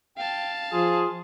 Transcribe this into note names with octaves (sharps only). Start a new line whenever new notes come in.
F5 G5 A5
F3 F4 G#4